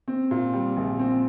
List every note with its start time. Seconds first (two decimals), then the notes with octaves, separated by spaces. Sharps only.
0.08 C4
0.31 A#2
0.54 G3
0.77 A#1
0.99 C4